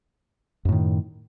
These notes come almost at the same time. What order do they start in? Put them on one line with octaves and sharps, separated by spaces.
F#2 A2 D#3